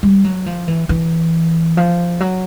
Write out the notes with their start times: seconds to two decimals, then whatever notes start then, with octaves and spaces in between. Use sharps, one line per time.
0.03 G3
0.24 F#3
0.46 F3
0.68 E3
0.89 E3
1.77 F3
2.20 F#3